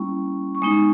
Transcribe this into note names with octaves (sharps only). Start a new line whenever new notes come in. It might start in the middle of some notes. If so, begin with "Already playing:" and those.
Already playing: G3 A#3 C#4 E4 C#6
C#6
G#3 B3 D#4 D#6